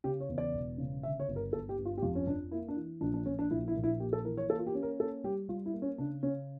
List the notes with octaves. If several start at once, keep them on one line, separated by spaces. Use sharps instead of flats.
C#3 G4
C#5
E2
D5
E1
C#3
D3 E5
C#5
G1
A#4
G1 A4
G4
G1
F4
G4
F2 F4
C#4
F2 D4
A#3 E4
D4
E3
A#1 D4
D4
A#1 C#4
D4
A#1 E4
E4
A#1
E4
A#3 G4
A4
E3 A#4
C#5
A#3 A4
F4
G4
C#4
A#4
A#3 A4
G3 G4
G3 F4
E4
A#3
C#4
C#3 D4
C#3 C#4